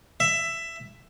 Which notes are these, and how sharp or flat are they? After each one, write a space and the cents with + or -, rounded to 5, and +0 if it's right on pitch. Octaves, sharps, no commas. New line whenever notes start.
E5 +10